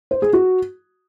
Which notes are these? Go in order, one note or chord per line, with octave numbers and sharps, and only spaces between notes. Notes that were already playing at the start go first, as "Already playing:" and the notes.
C5
G#4
F#4